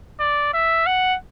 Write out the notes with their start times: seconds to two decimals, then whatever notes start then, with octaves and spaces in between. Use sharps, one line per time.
0.20 D5
0.54 E5
0.87 F#5